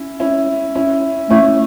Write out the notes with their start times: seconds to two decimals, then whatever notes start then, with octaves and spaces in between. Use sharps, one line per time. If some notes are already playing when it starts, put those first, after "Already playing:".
Already playing: C#4 E4
0.20 C#4 E4
0.75 C#4 E4
1.30 A3 C#4 E4